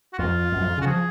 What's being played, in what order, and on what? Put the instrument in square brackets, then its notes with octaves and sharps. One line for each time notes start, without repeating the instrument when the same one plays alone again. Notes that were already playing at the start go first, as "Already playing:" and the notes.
[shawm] F#4
[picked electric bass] F2 [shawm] F4
[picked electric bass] F#2
F2
C#3
[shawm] F#4
[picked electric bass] F3 [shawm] G#4